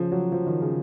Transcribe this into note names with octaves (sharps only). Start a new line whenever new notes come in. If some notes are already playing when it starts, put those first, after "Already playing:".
Already playing: C#3 F3
F#3
F3
D#3
C#3